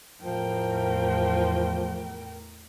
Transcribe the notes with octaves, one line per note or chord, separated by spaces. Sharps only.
E2 A2 F3 A#4 G5